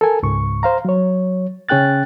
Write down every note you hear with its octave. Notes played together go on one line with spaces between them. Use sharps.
A4 A#4 G#5
C#2 G#2 C#6
C5 F5 A#5
F#3 C#5
C#3 C#4 G#4 G5 F#6 A6